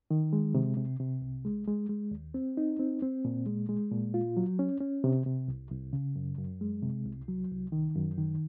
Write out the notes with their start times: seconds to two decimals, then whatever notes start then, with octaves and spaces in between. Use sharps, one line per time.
0.11 D#3
0.33 G#3
0.54 C3
0.77 C3
0.99 C3
1.22 C2
1.45 G#3
1.67 G#3
1.89 G#3
2.11 D#2
2.34 C4
2.57 D#4
2.79 C4
3.02 C4
3.25 A#2
3.46 G#3
3.69 G#3
3.92 A#2
4.14 F4
4.37 F#3
4.59 C#4
4.81 C#4
5.04 C3
5.26 C3
5.48 C2
5.71 C2
5.93 C#3
6.16 F#2
6.38 F#2
6.61 G#3
6.83 C3
7.05 C2
7.28 F#3
7.51 C2
7.72 D#3
7.96 F#2
8.18 D#3